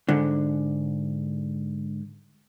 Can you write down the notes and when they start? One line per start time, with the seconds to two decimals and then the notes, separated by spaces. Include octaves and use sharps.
0.08 G#2 D3